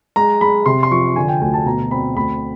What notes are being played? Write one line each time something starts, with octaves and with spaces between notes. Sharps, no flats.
G#3 A#5
G#3 B5
C3 C6
C6
F3 C#6
D3 G#5
G5
D2 G#5
A5
B2 A#5
C4 B5
D2 B5